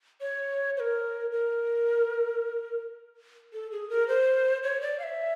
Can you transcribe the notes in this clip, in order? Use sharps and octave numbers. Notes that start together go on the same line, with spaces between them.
C#5
C5
A#4
A#4
A4
G#4
A#4
C5
C#5
D5
F5
E5